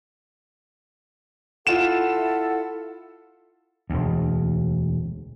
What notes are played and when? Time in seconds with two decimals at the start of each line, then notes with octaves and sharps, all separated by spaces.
1.67 E4 F4 A4 F#5 E7
3.90 E1 D2